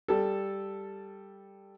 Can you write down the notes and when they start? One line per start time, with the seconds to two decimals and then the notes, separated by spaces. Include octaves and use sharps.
0.08 G3 A4